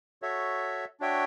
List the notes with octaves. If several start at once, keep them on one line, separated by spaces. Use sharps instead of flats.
F#4 A4 C#5 E5
D4 F#4 C#5 E5 G5